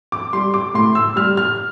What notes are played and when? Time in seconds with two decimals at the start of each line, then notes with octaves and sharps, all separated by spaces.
0.12 D6
0.33 G3 C6
0.54 D6
0.74 A2 C6
0.95 E6
1.16 G3 F6
1.37 F6